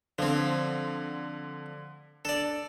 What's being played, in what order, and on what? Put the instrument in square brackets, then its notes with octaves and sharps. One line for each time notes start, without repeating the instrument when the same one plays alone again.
[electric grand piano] D3 [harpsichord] F3 C4
[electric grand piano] D4 [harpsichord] A4 D5